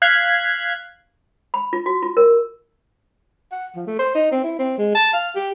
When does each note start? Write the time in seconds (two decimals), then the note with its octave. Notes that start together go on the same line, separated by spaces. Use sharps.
0.02 F5 F#6 G#6 B6 C7
1.54 B5
1.73 F4
1.86 F#4
2.02 F4
2.17 A#4
3.52 F#5
3.76 F3
3.87 A3
3.99 C5
4.15 D#4
4.32 C4
4.44 E4
4.59 C4
4.78 G#3
4.95 A5
5.13 F5
5.35 G4